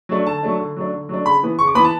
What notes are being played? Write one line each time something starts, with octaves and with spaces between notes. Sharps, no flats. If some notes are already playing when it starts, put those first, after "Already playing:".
F#3 A3 D4
D3 A5
F#3 A3 D4
D3
F#3 A3 D4
D3
F#3 A3 D4
C#3 B5
E3 B3
C#3 C#6
D6
E3 B3 B5
A5